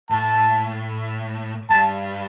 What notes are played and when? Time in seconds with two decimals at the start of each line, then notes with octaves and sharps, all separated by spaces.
0.10 A2 A5
1.70 G2 A5